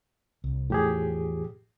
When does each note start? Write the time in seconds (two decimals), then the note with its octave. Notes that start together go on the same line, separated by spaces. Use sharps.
0.44 C2
0.70 E2 A2 F3 G4 G#4